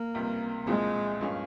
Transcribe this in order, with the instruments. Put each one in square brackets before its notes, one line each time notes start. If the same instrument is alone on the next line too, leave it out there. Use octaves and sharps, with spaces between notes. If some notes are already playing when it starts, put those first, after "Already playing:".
Already playing: [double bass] A#3
[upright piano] C#2 C3 G3
[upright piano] C2 A#2 F3 C4 [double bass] G#3
[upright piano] G2 F3 A#3 C#4